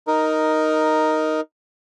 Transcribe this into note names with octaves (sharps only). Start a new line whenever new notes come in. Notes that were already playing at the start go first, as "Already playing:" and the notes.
D#4 A#4